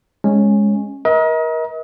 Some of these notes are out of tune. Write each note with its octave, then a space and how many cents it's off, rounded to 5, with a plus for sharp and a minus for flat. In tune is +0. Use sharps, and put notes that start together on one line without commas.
G#3 -5 C#4 -10
A#4 +35 D#5 +35